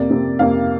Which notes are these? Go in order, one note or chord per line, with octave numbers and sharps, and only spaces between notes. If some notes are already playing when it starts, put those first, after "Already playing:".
Already playing: F2 C3 A#3 D5
F2 C3 A#3
F2 C3 A#3 F5